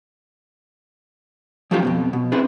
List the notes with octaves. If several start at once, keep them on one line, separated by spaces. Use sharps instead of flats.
F3 F#3 A3 C#4 F4 G4
F2 G#2 B2
B2
C4 D4 E4 G#4 B4